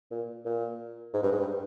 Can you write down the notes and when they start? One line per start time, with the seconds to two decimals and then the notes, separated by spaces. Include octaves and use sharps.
0.11 A#2
0.45 A#2
1.14 G#2
1.23 G2
1.32 G#2
1.40 G2